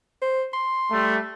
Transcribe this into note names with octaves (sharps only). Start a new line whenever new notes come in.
C5
C6
G3 A3